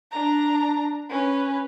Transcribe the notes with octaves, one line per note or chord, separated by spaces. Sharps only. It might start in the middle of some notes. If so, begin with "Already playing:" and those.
D4 A#5
C#4 B4